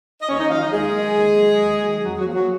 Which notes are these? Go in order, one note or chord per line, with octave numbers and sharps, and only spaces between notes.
D#5
D#2 C#4 C#5
D#4 D#5
D#3 F#3 F4 F5
D#4 D#5
D#2 G#3 G#4
D#3 F#3
D#2
D#3 F#3
D#2
D#3 F#3
F2 F#3 F#4
F#3 F#4
F3 A#3
F#3 F#4